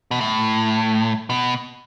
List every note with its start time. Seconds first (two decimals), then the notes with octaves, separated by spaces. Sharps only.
0.11 B2
0.21 A2
1.30 B2